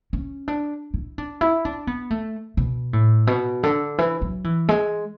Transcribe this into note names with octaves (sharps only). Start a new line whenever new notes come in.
C#4
D4
E4
D4
E4
D4
B3
A3
B2
A2
B2
D3
E3
F#3
E3
G#3